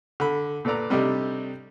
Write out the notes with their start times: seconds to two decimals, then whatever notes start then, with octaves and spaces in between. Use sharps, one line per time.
0.20 D3 A4 B5
0.65 A#2 A4 B4 D5 A#5
0.90 C3 G3 A3 D4 D#4 G4